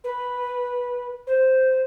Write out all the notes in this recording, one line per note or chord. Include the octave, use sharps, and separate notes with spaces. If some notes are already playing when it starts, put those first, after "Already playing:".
B4
C5